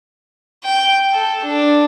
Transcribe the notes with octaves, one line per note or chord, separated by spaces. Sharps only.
G5
A4
D4